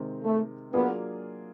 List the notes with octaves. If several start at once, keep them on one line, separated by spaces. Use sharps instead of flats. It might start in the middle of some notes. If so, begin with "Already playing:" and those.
Already playing: C3 D#3 G#3 C4
A3
F#3 A#3 B3 D4 F4 G#4